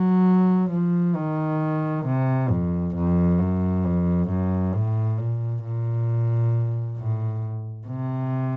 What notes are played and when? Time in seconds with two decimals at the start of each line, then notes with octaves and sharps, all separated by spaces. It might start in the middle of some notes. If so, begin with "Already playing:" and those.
Already playing: F#3
0.70 F3
1.16 D#3
2.06 C3
2.50 F2
2.95 F2
3.39 F#2
3.85 F2
4.29 F#2
4.74 A2
5.18 A#2
5.63 A#2
6.98 A2
7.87 C3